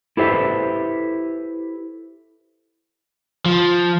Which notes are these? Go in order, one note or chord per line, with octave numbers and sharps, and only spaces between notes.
E4 G4 A4 B4 C5 E5
F3